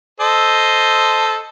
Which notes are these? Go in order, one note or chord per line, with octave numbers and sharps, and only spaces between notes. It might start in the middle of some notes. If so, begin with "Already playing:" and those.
A4 C5 D#5